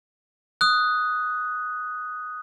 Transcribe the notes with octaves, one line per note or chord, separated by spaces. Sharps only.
D#6 F#6